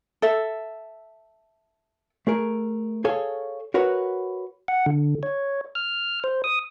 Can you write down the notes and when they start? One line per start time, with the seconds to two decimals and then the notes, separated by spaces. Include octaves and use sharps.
0.22 A4 E5
2.27 A3 G#4 A#4
3.05 G#4 A4 C#5 F5 G#5
3.74 F#4 A#4 B4 C#5 F#5
4.68 F#5
4.86 D3
5.23 C#5
5.75 F6
6.24 C5
6.44 D#6